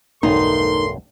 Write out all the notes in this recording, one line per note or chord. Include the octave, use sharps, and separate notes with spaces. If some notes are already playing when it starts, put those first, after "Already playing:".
B1 E2 G2 A3 D#4 A4 A#4 C6